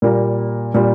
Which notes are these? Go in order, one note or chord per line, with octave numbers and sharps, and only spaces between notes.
A#2 G3 A#3
A#2 G3 A#3